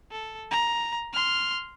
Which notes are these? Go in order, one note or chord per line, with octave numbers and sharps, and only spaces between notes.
A4
A#5
C6 F6